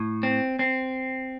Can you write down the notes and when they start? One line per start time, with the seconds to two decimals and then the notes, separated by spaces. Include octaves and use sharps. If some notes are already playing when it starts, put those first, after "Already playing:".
Already playing: A2
0.23 C4
0.59 C4